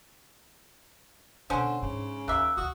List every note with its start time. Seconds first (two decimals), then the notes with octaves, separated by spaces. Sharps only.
1.50 B2 D3 C#4 D4 C5
1.82 G#2 C#3
2.28 D#2 A#3 E5 D6 E6 F#6
2.57 D2 F#4 D#6